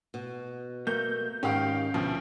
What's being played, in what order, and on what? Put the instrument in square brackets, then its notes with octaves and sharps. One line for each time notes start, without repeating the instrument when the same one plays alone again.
[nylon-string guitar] B2
[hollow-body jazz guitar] A3 A#3 [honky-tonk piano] G6
[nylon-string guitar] G#2 D#3 [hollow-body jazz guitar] C#4 [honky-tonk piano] G4 F5 G5
[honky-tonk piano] D2 F3 [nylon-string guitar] B2